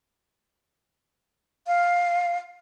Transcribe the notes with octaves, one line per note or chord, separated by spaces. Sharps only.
F5